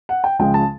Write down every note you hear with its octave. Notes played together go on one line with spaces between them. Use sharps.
F#5
G5
C#2 C#3 F3 G#3 G5
A5